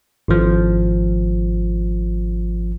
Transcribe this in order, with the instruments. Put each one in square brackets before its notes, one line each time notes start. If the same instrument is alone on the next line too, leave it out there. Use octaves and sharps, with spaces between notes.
[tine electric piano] G#1 F3